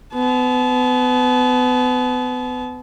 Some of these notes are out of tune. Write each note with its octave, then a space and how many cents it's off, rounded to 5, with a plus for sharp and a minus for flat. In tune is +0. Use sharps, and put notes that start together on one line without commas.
B3 +30 A5 -30